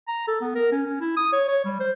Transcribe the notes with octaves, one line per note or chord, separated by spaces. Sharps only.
A#5
A4
B3
A#4
C#4
C#4
E4
D#6
C#5
C#5
G3
C5